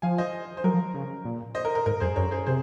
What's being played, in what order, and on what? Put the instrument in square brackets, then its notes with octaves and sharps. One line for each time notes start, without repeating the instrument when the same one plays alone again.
[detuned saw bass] F3 [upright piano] F5 G#5
[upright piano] C5 D#5
C5
[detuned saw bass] F#3 [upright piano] A#4
[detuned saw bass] F3
C#3
A#2
[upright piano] C5 D#5
A#4
A#4
[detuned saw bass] G#2 [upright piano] A#4
[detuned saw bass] F#2 [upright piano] G#4 C5
[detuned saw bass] F#2 [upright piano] A#4 C#5
[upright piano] G#4 C5
[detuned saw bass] C3 [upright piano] G#4 C5